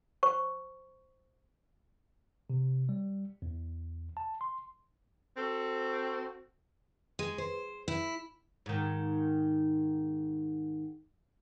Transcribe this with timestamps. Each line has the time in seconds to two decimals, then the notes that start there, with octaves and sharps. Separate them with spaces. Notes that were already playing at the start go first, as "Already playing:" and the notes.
0.23 C5 C#6
2.50 C3
2.89 G3
3.42 E2
4.17 A5
4.41 C6
5.37 C4 F#4 A4
7.19 G#3
7.38 C5
7.88 E4
8.66 G#2 D#3